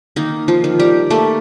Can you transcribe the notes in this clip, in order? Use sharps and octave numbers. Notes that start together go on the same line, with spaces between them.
D#3 A#3 D#4
F3 F4
D#3
G3 G4
A3 A#3 A4